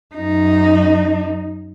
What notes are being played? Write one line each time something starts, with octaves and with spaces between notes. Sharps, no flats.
F#2 D#4